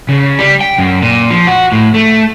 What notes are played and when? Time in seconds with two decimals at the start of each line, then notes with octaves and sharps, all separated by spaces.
0.09 C#3
0.39 G3
0.61 G5
0.78 F#2
1.02 A#2
1.31 F3
1.47 F#4
1.72 A2
1.94 A3